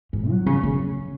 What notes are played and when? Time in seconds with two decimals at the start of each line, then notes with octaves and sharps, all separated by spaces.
0.13 G#2
0.30 F#3
0.46 C#3
0.63 C#3